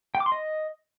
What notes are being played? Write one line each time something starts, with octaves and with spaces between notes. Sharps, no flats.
G5
D6
C6
D#5